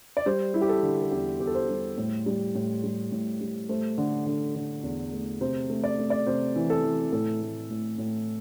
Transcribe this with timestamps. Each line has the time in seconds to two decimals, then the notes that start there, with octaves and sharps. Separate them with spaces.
0.17 D5
0.26 G3 C5
0.54 G3 E4
0.62 G4
0.69 A4
0.83 D3
1.02 A4
1.11 E2 G4
1.40 E2 G4
1.47 A4
1.55 C5
1.69 G3
1.98 A2
2.26 G3
2.55 A2
2.84 G3
3.12 A2
3.40 G3
3.69 A3 C5
3.98 D3
4.26 D3
4.55 D3
4.83 E2
5.13 A3
5.41 C3 C5
5.70 A3
5.84 D5
5.98 A3
6.10 D5
6.27 C3 C5
6.56 E3
6.70 A4
6.84 E3
7.12 A2 A4
7.42 A3
7.70 A2
7.98 A2